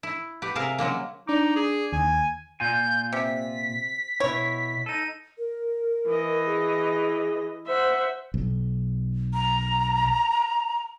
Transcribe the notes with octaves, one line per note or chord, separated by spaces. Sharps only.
E4
G4 B4 F#5
C3 G#4 A#4 E5 F5
C#3 F#3 G#3 A#3
D4 D#4 D6
G#4
D#2 G#5
A#2 F4 G#5 G6
C3 B6
B2 E4 C#5
D#4 A4 D#7
A#4
E3 D#5
G#4
C5 E5 F#5
B1
A#5